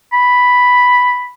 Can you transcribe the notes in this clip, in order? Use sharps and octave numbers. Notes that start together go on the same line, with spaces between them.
B5